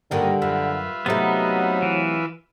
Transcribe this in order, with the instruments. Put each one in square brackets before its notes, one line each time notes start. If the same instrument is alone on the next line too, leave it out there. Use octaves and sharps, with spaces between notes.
[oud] G2 D#3 [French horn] D3 [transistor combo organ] A#3
[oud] F#2 [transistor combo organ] F4 B4 E5
[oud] C3 A3 [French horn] F#3 [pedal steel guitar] B3 D#4
[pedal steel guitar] E3